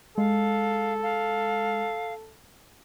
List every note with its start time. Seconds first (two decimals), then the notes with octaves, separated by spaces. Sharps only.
0.18 G#3 A4 F5
1.03 F5